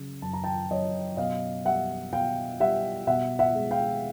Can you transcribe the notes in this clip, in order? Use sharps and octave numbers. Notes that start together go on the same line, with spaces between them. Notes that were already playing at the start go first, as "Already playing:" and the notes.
Already playing: C#3 F#3
F#2 A5
A#5
G5 A5
F#2 C#5 D#5
B2 D#5 F5
G3 E5 F#5
B2 F5 G5
G3 E5 F#5
B2 E5 F#5
E5 F#5
G#3
F5 G5